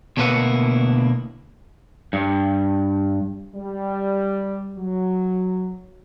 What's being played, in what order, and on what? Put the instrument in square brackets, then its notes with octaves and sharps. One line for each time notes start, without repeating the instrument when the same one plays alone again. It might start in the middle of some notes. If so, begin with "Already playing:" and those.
[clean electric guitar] D2 B2 A#3 E4 B4 F#5
G2
[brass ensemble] G3
F#3